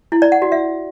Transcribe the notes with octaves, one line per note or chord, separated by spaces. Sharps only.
E4
D5
F#5
F#4
E5